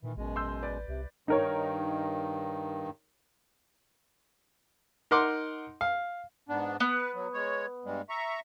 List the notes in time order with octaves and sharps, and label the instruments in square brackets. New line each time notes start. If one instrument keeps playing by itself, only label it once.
[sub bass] A#2 [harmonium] D#3 E3
[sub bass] A1 [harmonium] F#2 B2 G#3
[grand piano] C6 E6 G6
B4 D5
[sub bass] C2 [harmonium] C3
[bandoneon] G2 D#3 [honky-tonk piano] D#4 A#4 C#5
[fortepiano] D#4 A#4 F#5 C6 D6
F5
[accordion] G#2 B3 D4
[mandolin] B3 [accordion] B4
[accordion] F#3
G#3 C#5
G2 G3 G#3
E5 A#5 C#6